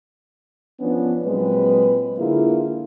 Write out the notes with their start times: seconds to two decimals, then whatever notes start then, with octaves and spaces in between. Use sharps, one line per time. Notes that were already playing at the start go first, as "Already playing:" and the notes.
0.80 F3 B3 C#4 D4
1.24 A#2 F#3 G#3 C4 B4
2.19 D3 A#3 E4 F4 G#4